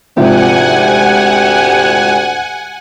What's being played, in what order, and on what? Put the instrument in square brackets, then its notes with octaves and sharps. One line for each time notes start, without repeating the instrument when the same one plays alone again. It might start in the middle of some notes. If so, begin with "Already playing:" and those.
[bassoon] D2 [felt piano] G#2 C3 F3 [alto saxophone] G4 [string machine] F#5 G#5